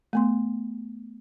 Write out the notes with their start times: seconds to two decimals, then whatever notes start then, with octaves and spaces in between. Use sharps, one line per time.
0.13 A3 B3 C6